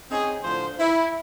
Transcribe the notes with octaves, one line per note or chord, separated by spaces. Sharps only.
C4 C#4 D#4 G#4
A2 D3 F3 C5
E4